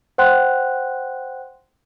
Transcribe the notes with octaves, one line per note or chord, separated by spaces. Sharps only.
C5 F#5 G5 C6 F#6